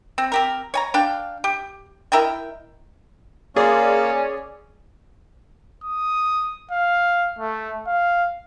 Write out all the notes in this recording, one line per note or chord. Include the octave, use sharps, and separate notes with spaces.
C4
C4 G4 A#4
C#5 G#5 A#5
D4 F5 G5
G4
E4 A#4 D#5 G5
A#3 C#4 G#4 D5 C6
D#6
F5
A3
F5